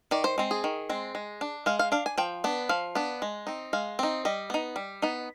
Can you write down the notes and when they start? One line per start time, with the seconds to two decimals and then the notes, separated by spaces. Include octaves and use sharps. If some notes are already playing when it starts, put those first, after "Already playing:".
0.11 D#3 D5
0.24 C5
0.38 G#3 C4
0.51 G#4
0.64 D#3
0.89 G#3 C4
1.15 G#3
1.41 D4
1.66 G#3 F5
1.79 F5
1.92 D4 F5
2.06 G#5
2.18 F3 G5
2.44 B3 D4
2.69 F3 F5
2.95 B3 D4
3.22 G#3
3.47 C4 D#4
3.73 G#3 F5
3.99 C4 D#4
4.25 G3 D#5
4.50 B3 D#4
4.76 G3
5.02 B3 D#4